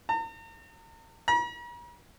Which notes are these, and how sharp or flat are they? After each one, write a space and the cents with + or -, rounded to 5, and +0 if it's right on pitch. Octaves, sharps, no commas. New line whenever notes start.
A#5 -45
A#5 +45